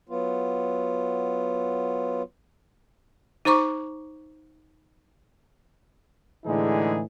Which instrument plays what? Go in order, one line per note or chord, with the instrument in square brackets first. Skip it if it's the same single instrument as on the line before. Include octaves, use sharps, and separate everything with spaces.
[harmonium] F#3 B3 F4
[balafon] D#4 C5 A#5 C#6 D6
[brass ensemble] A2 D3 E3 G#3 D#4 G#4